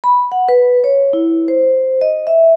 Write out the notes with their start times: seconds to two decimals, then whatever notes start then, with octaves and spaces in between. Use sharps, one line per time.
0.04 B5
0.32 F#5
0.49 B4
0.84 C#5
1.13 E4
1.48 C5
2.01 D#5
2.27 E5